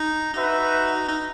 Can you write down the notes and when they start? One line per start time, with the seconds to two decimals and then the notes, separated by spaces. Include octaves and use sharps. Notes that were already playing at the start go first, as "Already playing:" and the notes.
Already playing: D#4
0.33 D#4 F#4 B4 E5
1.08 D#4